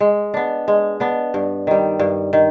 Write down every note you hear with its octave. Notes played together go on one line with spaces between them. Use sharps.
G#3
B3 D4
G#3
B3 D4
G2
D#3 G3
G2
D#3